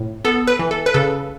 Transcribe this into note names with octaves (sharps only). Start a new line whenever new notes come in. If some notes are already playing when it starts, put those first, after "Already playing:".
Already playing: A2
B3 A4
B4
E3
A4
B4
C#3 A4